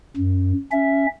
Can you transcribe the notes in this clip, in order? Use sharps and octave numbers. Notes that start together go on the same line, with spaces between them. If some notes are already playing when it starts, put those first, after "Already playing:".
F#2
C#4 E5